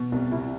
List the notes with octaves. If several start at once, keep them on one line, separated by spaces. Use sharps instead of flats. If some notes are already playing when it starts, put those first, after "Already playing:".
Already playing: B2
C2
C3 E4